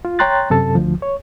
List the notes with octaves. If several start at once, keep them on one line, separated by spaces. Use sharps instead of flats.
F4
C#5 G5 A#5 C6 F#6 A6
F#2 C3 A4 A5
D2 F3
C#5